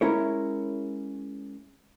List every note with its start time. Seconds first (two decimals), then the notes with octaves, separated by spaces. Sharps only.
0.01 G#3 C#4 E4 A#4 C#5